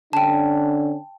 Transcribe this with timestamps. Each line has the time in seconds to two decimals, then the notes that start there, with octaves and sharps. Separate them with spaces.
0.13 D3 C#4 D4 G5 A5